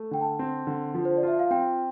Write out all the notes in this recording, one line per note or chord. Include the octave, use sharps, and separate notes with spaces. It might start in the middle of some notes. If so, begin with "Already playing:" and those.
Already playing: A3
D3 G5
A5
C4
D3
F3
C5
D5
F4 E5
F5
C4 G5